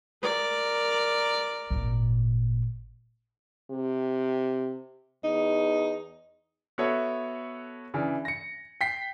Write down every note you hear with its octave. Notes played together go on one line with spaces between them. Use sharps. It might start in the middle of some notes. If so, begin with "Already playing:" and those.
A#4 D5
G#1 A#2
C3
E2 D#4
B3 F#4 A4 C#5 E5
C#3 E3 D4
A#6 C#7
G5 B6 C7